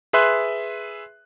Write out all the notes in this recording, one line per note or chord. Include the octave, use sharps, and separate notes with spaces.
G#4 B4 E5 C6 F#6